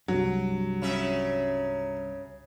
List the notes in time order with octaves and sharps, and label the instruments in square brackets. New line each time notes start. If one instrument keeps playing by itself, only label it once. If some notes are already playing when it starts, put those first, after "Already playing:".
[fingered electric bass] C2 G2 [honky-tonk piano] F#3
[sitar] C#3 C#4 E5